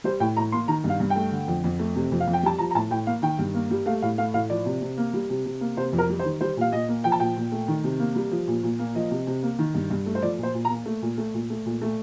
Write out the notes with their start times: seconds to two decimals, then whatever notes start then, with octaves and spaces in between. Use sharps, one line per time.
0.04 G3 C5
0.20 A2 G5
0.37 A2 A#5
0.52 A#3 C6
0.68 D#3 A#5
0.84 G2
0.90 F5
1.00 G2
1.10 G5
1.16 A3
1.32 D3
1.48 F2
1.64 F2
1.79 A3
1.96 C3
2.12 F2
2.20 F5
2.27 F2
2.33 G5
2.43 G3 A5
2.58 F3 A#5
2.71 A#5
2.75 A2 A5
2.90 A2 G5
3.07 A#3 F5
3.22 D#3 G5
3.39 G2
3.54 A#3
3.71 G3
3.86 A3 F5
4.02 A2 F5
4.18 A3 F5
4.34 A2 F5
4.50 F3 D5
4.66 C3
4.82 C3
4.97 A#3
5.13 G3
5.30 C3
5.46 C3
5.61 A#3
5.77 C3 C5
5.93 F2
5.98 A#4
6.09 G3
6.19 C5
6.25 D#3
6.41 G3 C5
6.57 A#2 F5
6.72 A#2 D#5
6.88 A#3
7.04 F3 G5
7.12 A5
7.20 A#2 G5
7.37 A#2
7.52 A3
7.68 D#3
7.84 C3
8.00 A#3
8.16 G3
8.31 F3
8.48 A#2
8.63 A#2
8.79 A#3
8.95 F3 D#5
9.11 C3
9.27 C3
9.43 A#3
9.59 D#3
9.75 G2
9.90 G2
10.06 A3
10.15 C5
10.22 F3 D5
10.39 A#2 C5
10.54 A#2
10.65 A#5
10.70 A#3
10.86 A3
11.02 A#2
11.18 A3
11.34 A#2
11.50 A3
11.66 A#2
11.82 A3